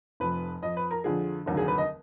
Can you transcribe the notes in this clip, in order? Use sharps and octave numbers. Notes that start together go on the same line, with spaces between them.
F1 F2 F3 B4
F2 F3 D#5
B4
A#4
F2 D3 F3 G#4
F1 D#2 D3 F#3
G#4
B4
D#5